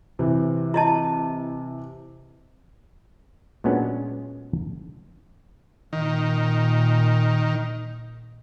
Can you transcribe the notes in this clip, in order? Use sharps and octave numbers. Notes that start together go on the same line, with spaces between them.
C3 E3
E4 D#5 A5
A#2 F#3 G#3 B3 C#4 D4
A#2 D#3